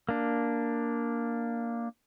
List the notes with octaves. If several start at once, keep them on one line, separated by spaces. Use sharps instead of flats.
A#3 D4